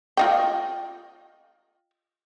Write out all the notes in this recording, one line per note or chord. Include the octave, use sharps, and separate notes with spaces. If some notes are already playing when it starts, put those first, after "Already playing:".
F4 D#5 G5